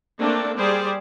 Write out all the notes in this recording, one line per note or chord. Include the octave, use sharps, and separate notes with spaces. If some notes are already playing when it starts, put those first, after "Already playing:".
A3 A#3 C4 D4 A4
G3 G4 G#4 C5 D5